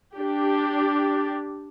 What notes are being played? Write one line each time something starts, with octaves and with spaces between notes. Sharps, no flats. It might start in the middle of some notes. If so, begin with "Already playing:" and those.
D4 G4